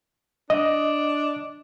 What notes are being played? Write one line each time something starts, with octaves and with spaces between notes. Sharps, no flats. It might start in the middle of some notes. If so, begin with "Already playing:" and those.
D4 D#5